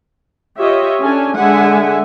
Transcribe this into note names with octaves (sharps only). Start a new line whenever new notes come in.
F4 G4 C#5 D#5 E5
C#4 D4 A4 G#5
D3 G#3 E5 F#5 G#5